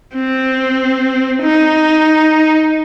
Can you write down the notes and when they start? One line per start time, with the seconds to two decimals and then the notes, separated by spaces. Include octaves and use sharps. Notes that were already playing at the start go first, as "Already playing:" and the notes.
0.15 C4
1.42 D#4